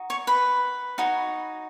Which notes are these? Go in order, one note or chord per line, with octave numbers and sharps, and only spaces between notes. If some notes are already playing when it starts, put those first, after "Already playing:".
Already playing: D#4 F#4
C#5 C#6
B4 B5
D#4 F#4 C#5